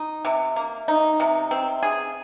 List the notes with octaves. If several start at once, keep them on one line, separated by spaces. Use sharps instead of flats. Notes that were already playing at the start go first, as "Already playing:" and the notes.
Already playing: D#4
C3
A#3
D#4
C3
C4
G#4